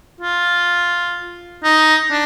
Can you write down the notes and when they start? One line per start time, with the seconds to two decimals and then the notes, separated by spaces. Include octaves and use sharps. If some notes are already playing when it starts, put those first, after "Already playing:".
0.21 F4
1.63 D#4
2.11 D4